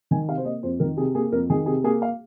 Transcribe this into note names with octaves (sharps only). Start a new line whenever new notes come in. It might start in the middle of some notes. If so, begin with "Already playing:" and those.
D#3 G#5
C3 F5
C5
A#3 D#5
F2 C5
D#3 A#4
C3 G#4
A#3 G#4
F2 A#4
D#3 G#4
C3 G#4
A#3 G#4
F5